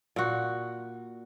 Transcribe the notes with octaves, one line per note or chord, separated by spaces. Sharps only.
A#2 F#4